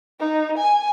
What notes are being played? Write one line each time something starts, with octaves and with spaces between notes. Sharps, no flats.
D#4
G#5